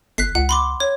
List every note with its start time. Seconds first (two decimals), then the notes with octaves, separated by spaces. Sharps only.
0.18 G1 F#6 B6 C7
0.35 C#2 F#5
0.49 B5 C6 D6
0.80 C#5